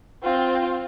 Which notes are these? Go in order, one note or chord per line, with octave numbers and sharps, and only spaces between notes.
C4 F4